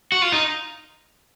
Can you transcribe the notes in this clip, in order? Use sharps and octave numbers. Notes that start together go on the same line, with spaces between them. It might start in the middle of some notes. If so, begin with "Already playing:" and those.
F#4
F4
D#4